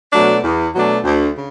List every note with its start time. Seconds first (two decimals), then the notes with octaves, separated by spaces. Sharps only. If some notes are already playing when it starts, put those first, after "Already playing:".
0.12 B2 F#3 A3 D4
0.43 E2
0.74 B2 F#3 A3 D4
1.04 D2
1.35 C#3